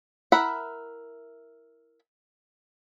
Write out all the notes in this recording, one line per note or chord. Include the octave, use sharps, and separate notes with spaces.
E4 A#4 E5 F#5 B5